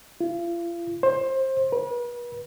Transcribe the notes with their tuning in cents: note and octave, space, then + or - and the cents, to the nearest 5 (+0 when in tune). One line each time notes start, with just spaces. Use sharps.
F4 -40
C5 +20
B4 -40